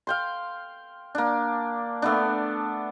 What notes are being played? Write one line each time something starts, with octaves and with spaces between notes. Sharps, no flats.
F5 G5 C6
A#3 D4
A3 B3 D4